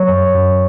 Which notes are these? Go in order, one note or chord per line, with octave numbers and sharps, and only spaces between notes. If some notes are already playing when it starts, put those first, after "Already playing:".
Already playing: F#3 C#5
F#2
F#2